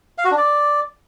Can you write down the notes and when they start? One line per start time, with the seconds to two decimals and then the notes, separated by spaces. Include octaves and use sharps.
0.18 F5
0.25 F#4
0.31 D4
0.38 D5